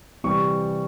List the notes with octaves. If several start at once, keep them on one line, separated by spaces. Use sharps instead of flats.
C3 E3 G3 C#6